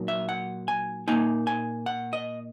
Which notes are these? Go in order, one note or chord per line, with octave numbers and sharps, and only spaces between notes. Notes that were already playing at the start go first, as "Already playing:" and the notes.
Already playing: A#2 F#3 D#4
E5
F#5
G#5
A#2 A#3 D#4 G#5
G#5
F#5
D#5